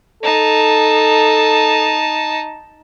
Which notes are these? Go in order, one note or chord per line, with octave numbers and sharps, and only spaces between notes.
D#4 A4 A5